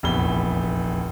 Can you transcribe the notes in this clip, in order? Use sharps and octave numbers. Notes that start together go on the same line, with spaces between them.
F1 A#1 E2 B5 G7